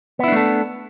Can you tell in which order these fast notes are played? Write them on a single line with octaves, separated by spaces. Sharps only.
B3 E4 D4 A3 A4